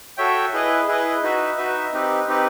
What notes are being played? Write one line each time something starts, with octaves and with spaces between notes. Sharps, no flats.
F#4 A4 C#5 E5 G5
E4 G#4 B4 D#5
E4 G#4 B4 D#5
D#4 F#4 B4 E5
D#4 F#4 B4 E5
C4 D#4 G4 B4
C4 D#4 G4 B4